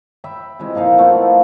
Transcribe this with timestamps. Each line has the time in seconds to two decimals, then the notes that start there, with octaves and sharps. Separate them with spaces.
0.24 E5 G5 B5
0.59 C3 E3 G#3
0.75 A#2 F3 D#4 F5
0.98 F3 A3 B3 E4